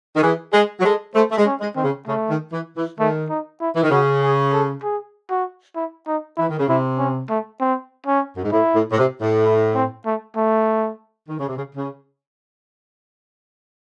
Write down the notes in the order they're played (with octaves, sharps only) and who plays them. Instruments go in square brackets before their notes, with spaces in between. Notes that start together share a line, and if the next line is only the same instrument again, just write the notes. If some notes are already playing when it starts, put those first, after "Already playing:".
[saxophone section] D#3
[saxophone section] E3 [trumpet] G#4
[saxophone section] G#3 [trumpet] G#4
[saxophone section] F#3
[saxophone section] G#3 [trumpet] A4
[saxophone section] A3 [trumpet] C5
[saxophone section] A3
G#3
[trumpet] C#4
[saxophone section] G#3
[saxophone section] D#3 [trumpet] C4
[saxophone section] C#3
[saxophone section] C#3 [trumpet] A3
[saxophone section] D#3
E3
E3
[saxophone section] D#3 [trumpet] A3
[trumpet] D#4
E4
[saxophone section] E3
D#3
[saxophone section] C#3 [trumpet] F#4
[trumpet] G#4
A4
G#4
F#4
E4
D#4
[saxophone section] E3 [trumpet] E4
[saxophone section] D#3
C#3
[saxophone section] C3 [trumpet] E4
[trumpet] C#4
A3
C4
C#4
[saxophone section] F#2
G#2
[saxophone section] A2 [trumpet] E4
[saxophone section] A2
A2
C3
A2
[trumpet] E4
C4
A3
A3
[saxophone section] D#3
C#3
C3
C#3
C#3